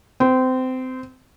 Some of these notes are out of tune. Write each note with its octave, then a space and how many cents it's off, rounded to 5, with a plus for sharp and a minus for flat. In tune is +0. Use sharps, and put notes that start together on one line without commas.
C4 -25